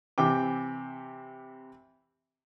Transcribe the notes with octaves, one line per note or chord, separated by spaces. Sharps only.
C3 E3 G5 D6